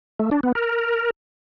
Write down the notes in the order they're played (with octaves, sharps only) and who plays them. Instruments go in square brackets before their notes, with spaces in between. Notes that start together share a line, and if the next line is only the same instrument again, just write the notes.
[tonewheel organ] A3
D4
B3
A#4